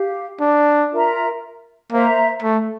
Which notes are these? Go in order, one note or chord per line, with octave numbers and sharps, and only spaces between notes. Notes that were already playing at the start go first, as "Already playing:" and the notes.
Already playing: G4 F5
D4
F4 A#4 E5 A#5
A#3 C5 E5 A#5
A3